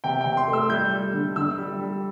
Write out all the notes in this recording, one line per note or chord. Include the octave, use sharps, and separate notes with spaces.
C3 G5
G5
C3
C6
A3
E6
G3 G6
G3
D3
D3 E6
G3
G3